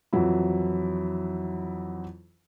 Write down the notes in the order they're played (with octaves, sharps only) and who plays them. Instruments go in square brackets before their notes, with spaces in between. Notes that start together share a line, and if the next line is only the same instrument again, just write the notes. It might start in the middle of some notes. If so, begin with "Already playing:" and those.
[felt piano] F2 E3 F#3 E4